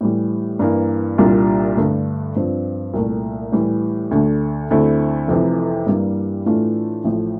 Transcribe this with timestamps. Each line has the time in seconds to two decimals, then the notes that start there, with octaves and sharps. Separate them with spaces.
0.01 A2 E3 G3
0.59 G2 E3 A#3
1.18 C2 A#2 G3 D4 F4
1.77 G2 D3 A3
2.36 G2 F3 C4
2.94 C2 A#2 A3
3.52 A2 E3 G3
4.11 D2 D3 A3
4.70 D2 D3 A3 C4 E4
5.28 F1 F2 C3 E3
5.86 G2 E3 G3 A#3
6.46 A2 E3 A3 D4 F4
7.04 A1 A2 F3